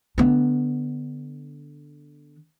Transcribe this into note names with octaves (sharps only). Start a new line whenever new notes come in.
D3 B3